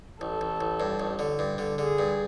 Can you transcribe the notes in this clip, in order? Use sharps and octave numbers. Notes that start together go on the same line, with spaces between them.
A1 A4
A1
A1
G2
A1
D3
G2
D3
D3 G#4
G2